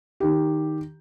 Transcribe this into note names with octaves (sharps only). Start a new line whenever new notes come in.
D#3 G4